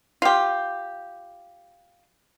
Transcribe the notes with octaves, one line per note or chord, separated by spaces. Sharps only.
F4 G4